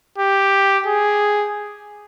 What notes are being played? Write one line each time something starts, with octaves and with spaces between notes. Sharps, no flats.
G4
G#4